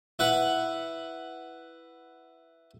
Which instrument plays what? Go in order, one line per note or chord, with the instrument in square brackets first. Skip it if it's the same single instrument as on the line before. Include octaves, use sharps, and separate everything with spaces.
[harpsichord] E4 B4 F#5